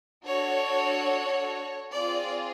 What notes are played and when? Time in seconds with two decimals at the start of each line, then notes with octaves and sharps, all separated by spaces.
0.24 D4 F#4 A4 C#5
1.92 C4 F4 G#4 D5